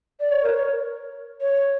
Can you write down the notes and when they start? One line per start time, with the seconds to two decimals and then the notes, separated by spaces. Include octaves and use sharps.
0.20 D5
0.31 C#5
0.44 A#4
0.54 C#5
1.41 C#5